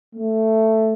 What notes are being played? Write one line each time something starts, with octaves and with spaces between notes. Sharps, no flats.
A3